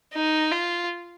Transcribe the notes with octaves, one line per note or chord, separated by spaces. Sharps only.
D#4
F4